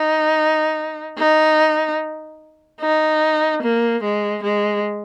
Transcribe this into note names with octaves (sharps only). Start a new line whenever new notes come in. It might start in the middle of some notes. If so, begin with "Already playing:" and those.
Already playing: D#4
D#4
D#4
A#3
G#3
G#3